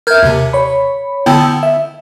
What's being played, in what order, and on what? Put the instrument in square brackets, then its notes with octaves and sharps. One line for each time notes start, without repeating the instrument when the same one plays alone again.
[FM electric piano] A#4 E5 [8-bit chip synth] F6 G6 G#6
[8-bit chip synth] D#2 C3
[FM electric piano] C#5 B5
[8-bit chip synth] D3 B3 E4 [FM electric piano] G5 A5 E6
[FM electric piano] E5